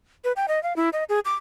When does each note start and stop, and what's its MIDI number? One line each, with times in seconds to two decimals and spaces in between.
0.24 0.32 71
0.36 0.46 79
0.48 0.62 75
0.63 0.76 77
0.76 0.89 64
0.93 1.04 75
1.09 1.20 68
1.25 1.34 86